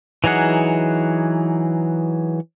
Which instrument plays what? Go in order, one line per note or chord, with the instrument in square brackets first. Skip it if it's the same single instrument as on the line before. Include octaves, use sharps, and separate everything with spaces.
[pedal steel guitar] E3 F#3 D#4 G#4 F#5